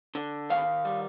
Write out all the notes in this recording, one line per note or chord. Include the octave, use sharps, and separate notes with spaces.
D3
D#3 F5
G3